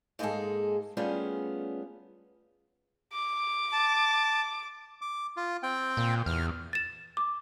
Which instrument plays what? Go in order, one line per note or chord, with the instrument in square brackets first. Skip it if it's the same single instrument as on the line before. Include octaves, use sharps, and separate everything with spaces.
[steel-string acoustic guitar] G#2 G#3 A#3 C#4 G#4 A4
G3 A3 B3 C#4 F4 G#4
[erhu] D6
[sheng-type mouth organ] A5
[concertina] D6
F4
C4 G5
[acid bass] A#2
[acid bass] E2 [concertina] F6
[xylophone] A6 E7
D6